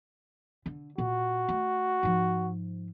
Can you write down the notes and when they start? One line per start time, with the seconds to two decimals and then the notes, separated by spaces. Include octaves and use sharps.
0.66 D3
0.98 A#2 F#4
1.48 A3
2.03 G#2 F3